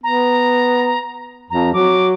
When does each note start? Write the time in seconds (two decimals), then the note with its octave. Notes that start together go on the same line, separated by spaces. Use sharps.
0.04 B3 A#5
1.50 F2 A#5
1.74 F#3 D6